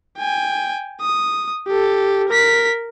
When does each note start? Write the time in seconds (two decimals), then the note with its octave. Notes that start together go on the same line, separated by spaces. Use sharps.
0.18 G5 G#5
1.01 D#6
1.67 G4 A4
2.29 A#4 B6